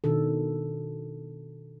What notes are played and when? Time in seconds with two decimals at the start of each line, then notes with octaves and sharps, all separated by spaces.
0.04 B2 D#3 D4 A4